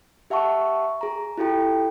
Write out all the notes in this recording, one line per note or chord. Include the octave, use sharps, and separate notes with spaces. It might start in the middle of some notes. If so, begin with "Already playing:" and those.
G4 E5 F#5 A5 C#6
G#4 A#5
E4 F4 G4 A4 G5